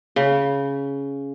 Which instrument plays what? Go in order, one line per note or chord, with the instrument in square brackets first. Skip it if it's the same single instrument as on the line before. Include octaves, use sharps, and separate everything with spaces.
[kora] C#3